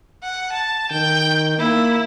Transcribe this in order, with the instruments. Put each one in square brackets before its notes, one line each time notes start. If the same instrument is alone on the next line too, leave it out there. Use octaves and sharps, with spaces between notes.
[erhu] F#5
A5
[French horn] D#3 [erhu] G5
[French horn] A#3 [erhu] E4